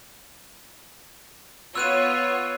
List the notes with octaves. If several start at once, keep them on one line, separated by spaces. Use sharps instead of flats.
B3 F4 C#5 E6 F#6 D#7